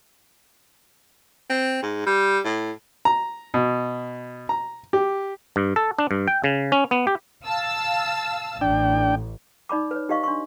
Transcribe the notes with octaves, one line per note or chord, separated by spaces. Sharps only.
C4
G#2
G3
A2
A#5
B2
A#5
G4
G2
A4
D4
G2
G5
C#3
C#4
B3
G4
F5 A5 E6
A1 D4 G5
D#4 D5 B5 D6
B4 C#5
D#4 G4 B4 D#5 F5 C#6
D4 C6 C#6